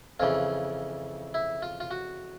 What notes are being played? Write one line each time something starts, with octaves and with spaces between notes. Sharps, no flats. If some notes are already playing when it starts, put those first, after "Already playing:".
F2 C#3 E3 F4
E4
F4
F4
F#4